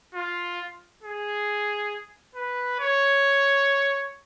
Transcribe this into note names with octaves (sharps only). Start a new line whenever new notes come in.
F4
G#4
B4
C#5